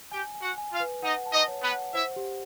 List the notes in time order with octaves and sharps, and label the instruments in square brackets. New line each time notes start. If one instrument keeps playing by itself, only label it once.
[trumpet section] G4 G5 [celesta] G#5
[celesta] G#5
[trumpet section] F#4 F#5
[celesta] G#5
[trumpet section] F4 F5
[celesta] B4
[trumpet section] D#4 D#5 [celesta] F#5
[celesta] A5
[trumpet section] D#4 D#5
[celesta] C#5
[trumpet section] B3 B4
[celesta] F#5
[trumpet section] E4 E5 [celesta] C5
[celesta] G4